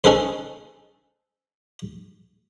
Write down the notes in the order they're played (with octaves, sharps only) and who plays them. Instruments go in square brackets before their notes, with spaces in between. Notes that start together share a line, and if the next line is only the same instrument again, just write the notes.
[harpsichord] C#4 D#4 G#4 A4 B4 C5